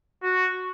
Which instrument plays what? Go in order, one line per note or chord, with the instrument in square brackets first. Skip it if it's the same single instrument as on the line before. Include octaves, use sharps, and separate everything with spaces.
[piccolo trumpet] F#4